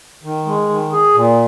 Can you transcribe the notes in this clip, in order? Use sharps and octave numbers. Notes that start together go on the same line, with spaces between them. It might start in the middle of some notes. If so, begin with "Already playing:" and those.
D#3
G#3
D#3
G#4
A#2